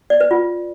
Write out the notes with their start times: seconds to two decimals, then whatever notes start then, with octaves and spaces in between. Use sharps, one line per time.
0.10 D5
0.20 B4
0.31 F4